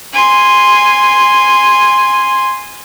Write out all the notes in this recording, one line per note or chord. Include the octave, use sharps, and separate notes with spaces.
G#5 C6